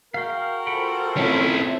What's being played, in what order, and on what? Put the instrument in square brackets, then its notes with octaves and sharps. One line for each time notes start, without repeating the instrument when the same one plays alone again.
[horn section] F#4 G#4 A#4 [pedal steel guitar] F5 G5
[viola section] F4 A4 C5 [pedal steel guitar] F#5 G5 B5
[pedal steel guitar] C4 [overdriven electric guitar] C#4 E4